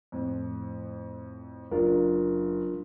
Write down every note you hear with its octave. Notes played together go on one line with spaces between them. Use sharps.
F2 A2
F#1 D4 F4 A#4